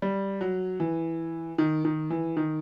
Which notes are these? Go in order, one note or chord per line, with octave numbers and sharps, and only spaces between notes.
G3
F#3
E3
D#3
D#3
E3
D#3